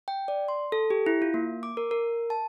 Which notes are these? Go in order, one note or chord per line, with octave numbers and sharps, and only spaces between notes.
G5
D5
C6
A4
G4
E4
F4
A#3
D6
A#4
A#4
A5